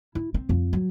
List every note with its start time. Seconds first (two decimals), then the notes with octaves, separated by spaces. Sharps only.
0.15 E4
0.34 C4
0.49 F2
0.73 F#3